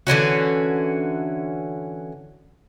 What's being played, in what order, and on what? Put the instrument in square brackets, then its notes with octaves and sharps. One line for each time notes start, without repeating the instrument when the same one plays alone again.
[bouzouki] D3 E3 C#4 F#4